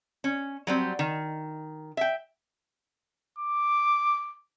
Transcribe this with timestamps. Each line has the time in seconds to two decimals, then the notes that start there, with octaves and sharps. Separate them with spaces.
0.24 C#4
0.67 F#3 G3 C4
0.99 D#3
1.97 E5 G5
3.39 D6